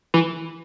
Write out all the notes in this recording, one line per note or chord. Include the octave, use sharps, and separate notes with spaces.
E3